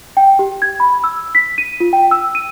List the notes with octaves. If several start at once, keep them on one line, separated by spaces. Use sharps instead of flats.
G5
G4
G#6
B5
E6
B6
D#7
F4
G5
E6
D#7